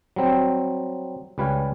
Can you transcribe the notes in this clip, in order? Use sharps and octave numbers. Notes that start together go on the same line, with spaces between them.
F#3 G3 C4
C#2 G3 B4 C#5 F5 G#5